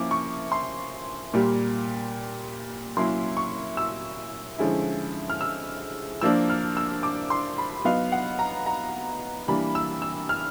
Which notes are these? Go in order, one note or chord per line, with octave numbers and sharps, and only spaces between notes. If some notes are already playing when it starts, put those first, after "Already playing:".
Already playing: F3 A#3 C#4 E4 D6
C#6
C6
A#2 G3 A#3
F#3 A#3 C#4 E4 C6
C#6
E6
D3 F3 G#3 C#4 E4
F6
E6
F3 A#3 D4 E6
F6
E6
D6
C6
B5
F#3 B3 D#4 F5
F#5
A#5
A#5
E3 G3 A#3 D4 B5
E6
E6
F6